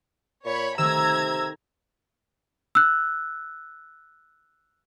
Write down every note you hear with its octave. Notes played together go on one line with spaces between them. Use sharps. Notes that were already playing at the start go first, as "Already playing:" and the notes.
A#2 C#5 B5
C3 D#3 A3 A#5 E6 G#6
E6 F#6